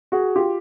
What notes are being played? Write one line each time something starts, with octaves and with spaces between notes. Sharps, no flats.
F#4 G#4
F4 G4